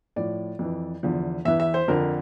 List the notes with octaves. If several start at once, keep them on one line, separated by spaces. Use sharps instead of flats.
A2 F3 D5
F2 E3
E2 D3 F3
E2 E3 E5
E5
C5
F2 D3 F3 A#4